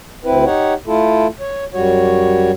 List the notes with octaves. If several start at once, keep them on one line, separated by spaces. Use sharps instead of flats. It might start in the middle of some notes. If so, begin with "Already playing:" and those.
D2 C4 E4 B4
D#4 G4 C#5 F#5
A3 E4 F4 A4
C#5
F#2 G3 F#4 C#5